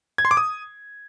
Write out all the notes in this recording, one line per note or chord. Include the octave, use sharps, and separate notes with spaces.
G#6
C6
D6
D#6